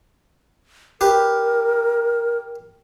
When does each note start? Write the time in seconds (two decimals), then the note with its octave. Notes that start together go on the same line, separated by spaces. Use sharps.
1.01 G4 A#4 B4